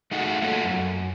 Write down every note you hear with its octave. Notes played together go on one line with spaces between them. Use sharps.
A3 D#4 F#4 G#4 F#5
A3 A#3 F4 F#4 A4 C#5
F#2